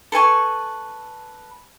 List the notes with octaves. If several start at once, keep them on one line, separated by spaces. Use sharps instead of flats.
A4 B4 G#5 C#6